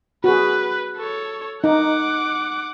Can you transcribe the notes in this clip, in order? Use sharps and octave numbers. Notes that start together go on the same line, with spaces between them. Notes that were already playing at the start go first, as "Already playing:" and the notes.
F#4 G#4 B4
A4 C#5
D#4 F#5 D6